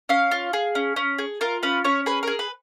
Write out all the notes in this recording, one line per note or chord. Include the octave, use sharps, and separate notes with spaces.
C#4 F5
F4
G#4
C#4
C#4
G#4
F4 A#4
C#4 B4
C#4 C#5
G#4 B4
G#4 A#4
B4